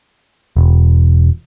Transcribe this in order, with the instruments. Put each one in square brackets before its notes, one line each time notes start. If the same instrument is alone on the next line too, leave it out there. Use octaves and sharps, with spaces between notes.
[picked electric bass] E1